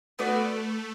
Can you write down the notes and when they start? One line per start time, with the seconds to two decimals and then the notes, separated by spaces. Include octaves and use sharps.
0.19 A3 B3 F#4 B4 D5